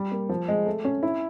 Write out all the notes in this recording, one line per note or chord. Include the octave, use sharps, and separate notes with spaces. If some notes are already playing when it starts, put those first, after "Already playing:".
Already playing: G3
A#3
F3
G#3
A3
C#4
E4